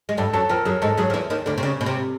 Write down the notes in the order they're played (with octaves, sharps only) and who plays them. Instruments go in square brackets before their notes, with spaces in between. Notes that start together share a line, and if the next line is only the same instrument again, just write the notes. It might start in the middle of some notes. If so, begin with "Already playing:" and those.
[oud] G#3
[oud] G2 G3 [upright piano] A4
[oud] F#2 F#3 [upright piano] A4
[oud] F2 F3 [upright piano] A#4
[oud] F#2 F#3 [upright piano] G#4
[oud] G#2 G#3 [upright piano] A4
[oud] F#2 F#3 [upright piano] G#4
[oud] F3
E2 E3
D#2 D#3
D2 D3
C3
C#3
B2
C3